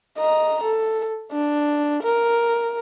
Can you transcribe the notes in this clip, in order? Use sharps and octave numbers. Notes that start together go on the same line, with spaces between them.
D#5 A#5
A4
D4
A#4